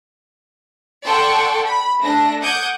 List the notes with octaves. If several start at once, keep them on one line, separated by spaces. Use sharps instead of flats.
A4 D5 F#5 G5 C6 C#6
B5
A3 D4 A#6
F#5 D6 D#6 G6 G#6